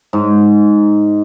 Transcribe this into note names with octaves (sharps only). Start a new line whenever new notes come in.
G#2